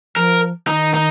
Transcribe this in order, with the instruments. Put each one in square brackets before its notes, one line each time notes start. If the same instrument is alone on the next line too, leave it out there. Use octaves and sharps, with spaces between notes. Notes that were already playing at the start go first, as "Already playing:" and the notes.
[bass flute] F3 [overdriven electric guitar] A#4
[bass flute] D#3 [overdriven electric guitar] D#4
[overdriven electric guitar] D#4